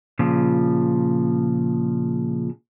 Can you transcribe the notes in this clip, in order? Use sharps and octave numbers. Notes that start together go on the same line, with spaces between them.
A#2 C#3 F3